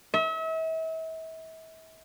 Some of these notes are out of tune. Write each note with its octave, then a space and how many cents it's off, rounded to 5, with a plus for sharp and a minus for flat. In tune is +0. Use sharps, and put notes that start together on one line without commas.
E5 -40